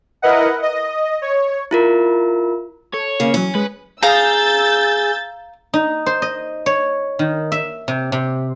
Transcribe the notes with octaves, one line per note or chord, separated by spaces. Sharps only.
E4 A#4 B4 D#5 F#5
D#5
C#5
E4 F4 A#4
A4 C#5
C#3 A#3
E3 F#3 C#4
G#3 B4
G#4 F5 A#5 E6 G6 A6
D#4
C5
D#5
C#5
D#3
E5
C3
C3